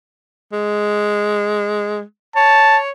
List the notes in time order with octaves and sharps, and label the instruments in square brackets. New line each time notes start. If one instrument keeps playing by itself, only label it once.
[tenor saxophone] G#3
[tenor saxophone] C#5 [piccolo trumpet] A5